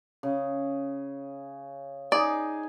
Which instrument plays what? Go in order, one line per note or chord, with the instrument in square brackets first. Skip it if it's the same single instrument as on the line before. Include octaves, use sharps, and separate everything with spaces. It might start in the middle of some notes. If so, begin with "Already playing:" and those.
[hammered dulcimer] C#3
[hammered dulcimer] D#4 G#4 [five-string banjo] D5